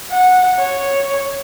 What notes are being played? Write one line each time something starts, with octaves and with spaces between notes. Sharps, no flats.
F#5
C#5